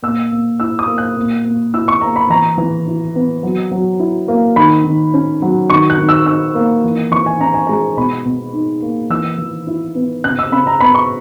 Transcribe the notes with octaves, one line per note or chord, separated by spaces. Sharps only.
A#2 E6
A#2
E4 E6
D#6
A#3
F#6
A#2
A#2
E4 E6
C#6
A#3 A#5
B5
E3 A#5
E3
E4
B3
F#3
F#3
E4
A#3
D#3 B5
D#3
C#4
F#3
D#3 C#6
F#6
D#3
E6
D#4 E6
A#3
E3
E3 C#6
G#5
C#4 A#5
G#5
G#3 A#5
B2 B5
B2
D#4
A#3
E3 E6
E3
E4
B3
C#3 F#6
E6
C#3 B5
A#5
B3 B5
C#6